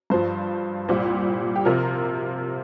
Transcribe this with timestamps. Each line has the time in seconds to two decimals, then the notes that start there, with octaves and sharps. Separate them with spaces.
0.10 G2 F3 C5
0.88 C2 A#2 G3 C5
1.56 G4
1.65 C3 F3 A#4